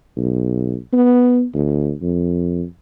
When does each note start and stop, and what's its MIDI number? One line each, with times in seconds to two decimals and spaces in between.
0.17 0.76 35
0.93 1.44 59
1.54 1.93 38
2.02 2.64 41